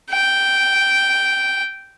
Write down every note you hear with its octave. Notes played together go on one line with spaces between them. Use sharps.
G5